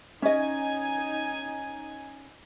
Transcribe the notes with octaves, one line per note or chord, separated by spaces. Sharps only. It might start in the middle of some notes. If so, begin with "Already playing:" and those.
C#4 D#4 D#5 G#5